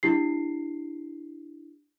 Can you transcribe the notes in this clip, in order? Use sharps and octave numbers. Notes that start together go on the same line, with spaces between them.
D4 E4 G4 C7